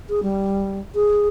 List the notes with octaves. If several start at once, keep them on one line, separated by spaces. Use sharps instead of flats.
G#4
G3
G#4